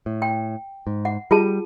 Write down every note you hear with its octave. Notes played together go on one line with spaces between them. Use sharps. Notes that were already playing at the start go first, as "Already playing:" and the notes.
A2
G5
G#2
F#5
G3 F4 G#4 A5